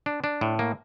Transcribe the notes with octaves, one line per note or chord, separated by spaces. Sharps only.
D4
D4
A2
A#3